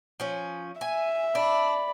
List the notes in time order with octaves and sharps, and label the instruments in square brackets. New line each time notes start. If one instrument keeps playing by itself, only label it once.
[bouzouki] F3 C#4
[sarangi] E5 [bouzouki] G#5
[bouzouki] D4 [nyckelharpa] D5 B5